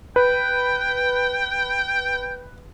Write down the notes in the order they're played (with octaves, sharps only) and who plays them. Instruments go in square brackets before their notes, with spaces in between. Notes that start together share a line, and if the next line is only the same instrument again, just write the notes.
[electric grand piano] B4 [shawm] G5